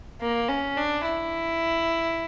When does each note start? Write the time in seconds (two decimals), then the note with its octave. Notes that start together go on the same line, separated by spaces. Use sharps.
0.21 A#3
0.49 C#4
0.78 D4
1.07 E4